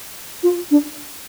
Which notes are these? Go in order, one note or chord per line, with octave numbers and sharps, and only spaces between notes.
F4
D4